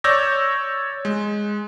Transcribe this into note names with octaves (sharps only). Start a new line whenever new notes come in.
C#5 D5 E6 G6 G#6 A#6
G#3